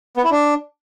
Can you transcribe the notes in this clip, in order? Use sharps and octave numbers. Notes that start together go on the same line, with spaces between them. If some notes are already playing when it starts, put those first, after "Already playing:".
B3
E4
D4